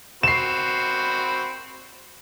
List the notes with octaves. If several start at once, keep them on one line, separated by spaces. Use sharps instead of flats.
C4 F#4 B5 C7 E7